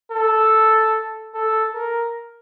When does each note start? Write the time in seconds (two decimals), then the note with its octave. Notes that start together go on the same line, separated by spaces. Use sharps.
0.12 A4
1.34 A4
1.74 A#4